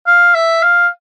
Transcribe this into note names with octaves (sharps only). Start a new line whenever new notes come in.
F5
E5
F5